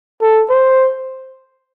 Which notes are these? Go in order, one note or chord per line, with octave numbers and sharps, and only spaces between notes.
A4
C5